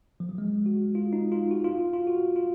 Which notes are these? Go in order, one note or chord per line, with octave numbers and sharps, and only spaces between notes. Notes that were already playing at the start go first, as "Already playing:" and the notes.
F3
F#3
G#3
F#4
F4
D#4
F4
F#4
F4
F4
F#4
F4